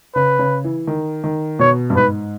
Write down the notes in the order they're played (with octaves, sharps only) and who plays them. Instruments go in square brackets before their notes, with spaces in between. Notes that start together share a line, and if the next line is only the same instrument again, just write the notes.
[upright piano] C#3 [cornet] B4
[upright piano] C#3
E3
D#3
D#3
[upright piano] B2 [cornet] C#5
[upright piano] G2
[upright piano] G#2 [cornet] B4